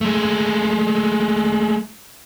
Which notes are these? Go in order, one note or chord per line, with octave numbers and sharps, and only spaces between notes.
G#3 A3